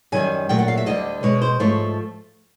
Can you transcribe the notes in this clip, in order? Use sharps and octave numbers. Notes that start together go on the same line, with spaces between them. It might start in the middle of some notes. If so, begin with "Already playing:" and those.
F#2 D#3 G3 G#5
A#2 F#3 A3 G5
F#5
F5
E5
D2 D3 G3 D#5
B2 G#3 C#5
C5
G#2 F3 A3 C#5